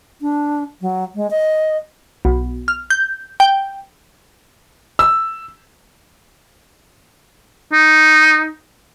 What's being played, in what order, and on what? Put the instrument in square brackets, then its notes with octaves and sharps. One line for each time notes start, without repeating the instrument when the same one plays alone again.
[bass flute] D4
F#3
G#3
D#5
[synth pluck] B1
F6
G6
G5
[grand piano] E6
[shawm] D#4